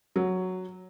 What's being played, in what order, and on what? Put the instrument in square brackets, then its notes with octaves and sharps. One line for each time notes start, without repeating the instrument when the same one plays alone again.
[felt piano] F#3